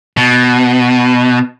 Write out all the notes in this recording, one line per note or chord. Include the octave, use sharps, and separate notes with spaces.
B2